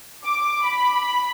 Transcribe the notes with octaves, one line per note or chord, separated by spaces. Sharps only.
D6
B5